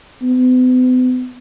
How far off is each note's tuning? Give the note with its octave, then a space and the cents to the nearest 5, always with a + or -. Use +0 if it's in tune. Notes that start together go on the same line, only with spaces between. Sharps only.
B3 +45